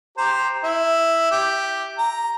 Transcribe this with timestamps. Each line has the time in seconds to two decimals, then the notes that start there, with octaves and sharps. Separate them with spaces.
0.18 G4 C5 A#5
0.64 E4
1.31 G4
1.98 A#5